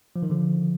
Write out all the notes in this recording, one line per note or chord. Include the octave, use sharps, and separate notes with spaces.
F3
D#3
D3 F3